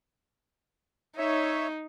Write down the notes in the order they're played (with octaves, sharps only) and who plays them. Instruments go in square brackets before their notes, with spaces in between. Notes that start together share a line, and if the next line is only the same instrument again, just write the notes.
[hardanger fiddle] D#4 [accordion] C#5 E5